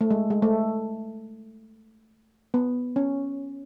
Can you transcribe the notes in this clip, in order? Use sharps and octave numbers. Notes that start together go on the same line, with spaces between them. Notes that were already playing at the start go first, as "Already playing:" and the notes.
A3
G#3
G#3
A3
B3
C#4